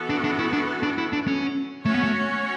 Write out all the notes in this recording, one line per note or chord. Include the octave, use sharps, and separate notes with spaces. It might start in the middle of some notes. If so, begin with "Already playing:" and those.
Already playing: E3 B3 F#4 A4
D4
D4
E4
D4
D4
E4
D4
C#4
A3 C#4 F#4 C#5
B3
A3